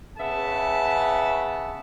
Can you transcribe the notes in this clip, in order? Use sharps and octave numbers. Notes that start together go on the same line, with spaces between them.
C#3 B3 E5 A5